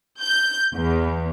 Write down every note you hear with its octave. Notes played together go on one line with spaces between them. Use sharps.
G6
E2